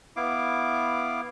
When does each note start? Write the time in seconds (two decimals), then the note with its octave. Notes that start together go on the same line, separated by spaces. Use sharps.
0.16 B3 E4 F5 D6